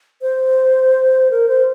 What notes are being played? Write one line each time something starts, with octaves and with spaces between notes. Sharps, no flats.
C5
A#4
C5